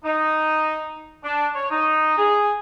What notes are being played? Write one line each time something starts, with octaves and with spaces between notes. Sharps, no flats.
D#4
D4
C#5
D#4
G#4